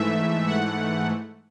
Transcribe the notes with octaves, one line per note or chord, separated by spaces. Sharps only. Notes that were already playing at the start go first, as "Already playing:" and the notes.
Already playing: G#2 E3 A3 E5
F#5